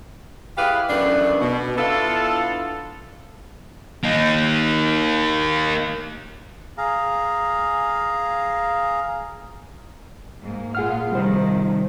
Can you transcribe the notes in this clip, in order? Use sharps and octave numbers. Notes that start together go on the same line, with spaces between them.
E4 G4 G#4 B4 D5 F5
F#2 C#3 E3 A3 B3 D4
B2
B3 D4 E4 F4 A4
A#3 D#4
G#4 F5 A#5
G#2 A#3
A#2 F4 G#4 F#5 F6
C3 D#3 F3 G3 C5